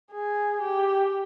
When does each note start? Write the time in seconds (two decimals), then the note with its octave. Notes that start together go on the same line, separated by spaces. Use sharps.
0.12 G#4
0.61 G4